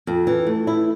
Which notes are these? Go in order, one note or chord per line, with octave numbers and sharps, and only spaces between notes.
F2
E3
A3
E4